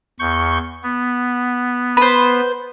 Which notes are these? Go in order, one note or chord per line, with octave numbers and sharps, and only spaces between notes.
E2 C#6 G6
B3
B4 C5